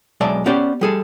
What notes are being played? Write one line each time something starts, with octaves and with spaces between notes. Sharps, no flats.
B1 G#3 D5 E5 A5
B3 C#4 G4 C5 D5 G5
G3 G#4 A4